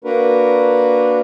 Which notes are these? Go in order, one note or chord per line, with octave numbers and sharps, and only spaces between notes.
A#3 D4 F#4 A#4 B4